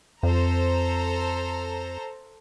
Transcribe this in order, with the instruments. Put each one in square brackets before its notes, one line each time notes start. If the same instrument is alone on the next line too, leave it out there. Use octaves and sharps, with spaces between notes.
[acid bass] F2 [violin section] A4 C5 A#5